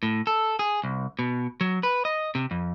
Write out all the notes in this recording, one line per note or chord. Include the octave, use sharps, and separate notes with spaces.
A2
A4
G#4
C2
B2
F#3
B4
D#5
C3
F2